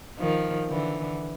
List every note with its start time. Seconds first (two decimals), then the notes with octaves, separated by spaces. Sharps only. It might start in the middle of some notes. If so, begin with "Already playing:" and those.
0.19 D#3 F3
0.70 D3 E3